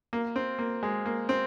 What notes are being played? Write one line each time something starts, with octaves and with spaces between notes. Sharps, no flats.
A#3
C4
A#3
G#3
A#3
C4